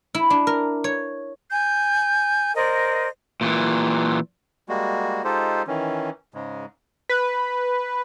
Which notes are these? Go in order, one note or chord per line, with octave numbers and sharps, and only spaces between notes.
E4
D4
A#4
C#5
G#5 G6
A#4 C5 D5 D#5
A#2 D#3 E3
G3 G#3 A#3 F#4
G#3 D#4 F4 G4 A4 C5
D#3 E3 C#4
G#2 C#3 G#3
B4